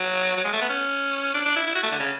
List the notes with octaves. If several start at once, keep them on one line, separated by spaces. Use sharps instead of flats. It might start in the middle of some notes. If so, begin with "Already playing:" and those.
Already playing: F#3
F#3
G#3
A3
B3
C#4
D4
D4
E4
E4
F#4
A3
D3
C#3